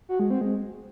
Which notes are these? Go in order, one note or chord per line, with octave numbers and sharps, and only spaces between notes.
F#4
G#3
C4
G#3